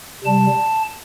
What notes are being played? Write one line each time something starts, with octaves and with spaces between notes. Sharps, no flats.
C3 G3 A5